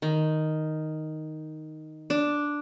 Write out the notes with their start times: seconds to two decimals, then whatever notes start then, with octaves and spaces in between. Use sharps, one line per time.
0.02 D#3
2.10 D4